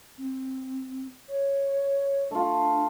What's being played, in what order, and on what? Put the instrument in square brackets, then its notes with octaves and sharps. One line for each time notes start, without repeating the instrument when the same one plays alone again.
[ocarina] C4
C#5
[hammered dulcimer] A3 F4 [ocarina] D4